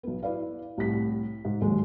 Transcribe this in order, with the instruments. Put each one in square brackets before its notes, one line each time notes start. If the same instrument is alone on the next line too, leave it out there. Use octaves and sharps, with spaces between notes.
[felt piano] B1 B3
E4 B4 D5 F5
C2 A2 B6
G#2
D#2 G#2 F#3 G#3